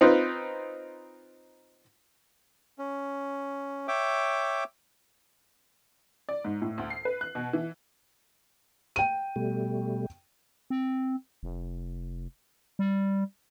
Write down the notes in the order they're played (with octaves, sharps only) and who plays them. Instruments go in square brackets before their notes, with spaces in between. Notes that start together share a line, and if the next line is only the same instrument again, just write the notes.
[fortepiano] C4 D#4 F4 B4
[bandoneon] C#4
C#5 E5 G5 D6
[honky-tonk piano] D5
G#2
A2
D2
C7
B4
F#6
B2
E3
[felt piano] G5 D#7
[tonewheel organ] B2 G3 A3
[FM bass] C4
F1
G3